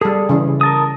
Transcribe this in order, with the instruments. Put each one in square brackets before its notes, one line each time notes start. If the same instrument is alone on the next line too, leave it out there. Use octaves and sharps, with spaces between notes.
[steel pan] G3 A4 [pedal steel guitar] G#4
[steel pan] C#3 E3
[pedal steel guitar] A#4 A5 D#6